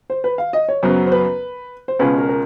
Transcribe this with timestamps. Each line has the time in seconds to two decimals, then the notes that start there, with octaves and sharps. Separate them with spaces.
0.10 C5
0.24 B4
0.38 F5
0.53 D#5
0.69 C#5
0.83 F#2 C#3 F#3 B3 C5
1.07 C5
1.12 B4
1.88 C5
1.99 C#2 B2 G#3 C#4 F4 B4
2.18 A#4
2.29 A#4